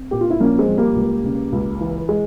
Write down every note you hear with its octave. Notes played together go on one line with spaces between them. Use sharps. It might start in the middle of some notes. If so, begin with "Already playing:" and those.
Already playing: C4
A#2 G4
F4
E4
A#1 A#3 C#4
G#3 C4
A#1
G3 A#3
C#2
C#3
C#2
E3
G#3